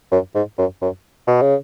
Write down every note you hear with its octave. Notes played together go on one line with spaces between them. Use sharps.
F#2
G#2
F#2
F#2
B2
C#3